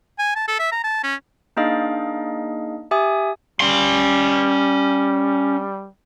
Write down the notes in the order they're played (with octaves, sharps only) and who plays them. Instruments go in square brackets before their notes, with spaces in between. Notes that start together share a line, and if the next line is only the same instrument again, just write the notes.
[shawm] G#5
A5
A4
E5
A#5
A5
C#4
[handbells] A#3 D4 D#4 G#4 D#5 F5
G4 E5 G#5 D#6
[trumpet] G3 [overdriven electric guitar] C#4 C6